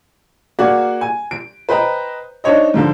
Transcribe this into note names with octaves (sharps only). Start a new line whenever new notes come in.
A#3 F#4 G#4 D5 F#5
G#5
D7
B4 C5 D#5 G5 A#5
D4 D#4 C5 C#5 D#5
G#2 D3 F3